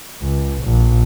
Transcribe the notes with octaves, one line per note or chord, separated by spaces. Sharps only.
C#2
A#1